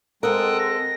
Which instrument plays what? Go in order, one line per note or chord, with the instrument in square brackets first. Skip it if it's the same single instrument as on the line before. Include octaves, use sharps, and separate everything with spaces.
[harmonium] G#3 C4 [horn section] A4 [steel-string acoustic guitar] A#4 F#5 [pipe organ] G5 D#6 F#6
[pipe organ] A#6